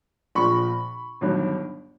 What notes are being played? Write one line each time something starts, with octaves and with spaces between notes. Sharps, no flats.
A#1 A#2 F3 B5 C#6
G1 G2 D#3 F#3